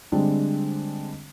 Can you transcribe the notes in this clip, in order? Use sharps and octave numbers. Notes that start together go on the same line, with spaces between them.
D3 G3 G#3 C4 D4